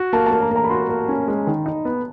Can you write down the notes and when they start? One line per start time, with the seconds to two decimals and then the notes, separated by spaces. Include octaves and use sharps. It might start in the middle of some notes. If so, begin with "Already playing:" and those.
Already playing: F#4
0.13 A#3 A5
0.26 A5
0.32 A#3
0.41 A#5
0.51 A#3 A#5
0.64 B5
0.69 F#4 C6
0.89 A#3
1.08 C#4
1.28 G#3
1.47 D#3
1.66 D#4
1.85 B3